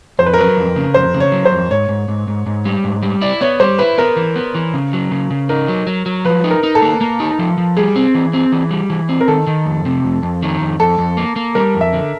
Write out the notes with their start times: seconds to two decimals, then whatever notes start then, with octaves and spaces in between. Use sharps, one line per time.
0.19 F2 C5
0.26 B4
0.34 A#4
0.39 F#3 B4
0.57 F2
0.76 C#3
0.94 F2 C5
1.14 C#3
1.20 C#5
1.32 F#3
1.45 C5
1.52 F2
1.70 G#2 C#5
1.89 G#2
2.08 G#2
2.28 G#2
2.46 G#2
2.65 G3
2.84 G#2
3.02 G3
3.21 E4 D5
3.41 B3 C#5
3.60 G3 C5
3.79 E4 B4
3.98 B3 A#4
4.16 E3
4.36 B3
4.55 E3
4.74 C#3
4.93 F#3
5.11 C#3
5.31 C#3
5.49 D#4 A#4
5.68 F#3
5.87 F#3
6.06 F#3
6.25 F3 B4
6.44 D#4
6.51 A#4
6.63 D#4
6.75 A4
6.82 A#3
7.01 A#3
7.20 D#4
7.39 F3
7.58 F3
7.77 G3 G#4
7.96 C4
8.14 E3
8.33 C4
8.52 E3
8.71 G3
8.90 E3
9.09 C4
9.21 A#4
9.28 D#3 A4
9.47 D#3
9.66 F2
9.85 C3
10.04 F2
10.23 F2
10.42 D#3
10.61 F2
10.79 F2 A4
10.98 F2
11.17 A#3
11.36 A#3
11.55 G3 A#4
11.74 F2
11.81 E5
11.93 D3